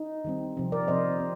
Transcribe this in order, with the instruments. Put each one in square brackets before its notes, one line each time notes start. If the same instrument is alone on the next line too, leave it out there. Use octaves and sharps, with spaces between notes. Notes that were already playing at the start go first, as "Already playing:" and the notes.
Already playing: [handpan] D#4
D#3 G3 C4
C3 F3 C4
A#4 D5
C3 F3 C4 C5 D#5
C4